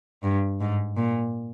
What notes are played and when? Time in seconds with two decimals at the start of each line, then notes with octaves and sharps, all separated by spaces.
0.23 G2
0.61 G#2
0.97 A#2